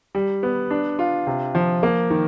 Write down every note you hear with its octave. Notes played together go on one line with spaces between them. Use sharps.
G3
B3
D4
F4
C3
F3
A#3
D#3